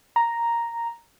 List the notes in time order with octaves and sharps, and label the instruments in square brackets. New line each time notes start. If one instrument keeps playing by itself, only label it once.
[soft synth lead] A#5